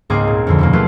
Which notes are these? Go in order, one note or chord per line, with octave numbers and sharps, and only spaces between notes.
C#2 G#2 A#3 C4 G#4 D6
A#2
F2 D3 F3
D#2 B2 A#3
F#3 A3 C#4 F4 G4 B4